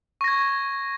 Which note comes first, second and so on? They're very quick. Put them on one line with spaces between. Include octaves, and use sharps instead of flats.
C#6 A#6 G#6